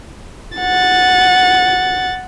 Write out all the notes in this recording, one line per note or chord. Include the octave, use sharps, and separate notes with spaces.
F#5 A6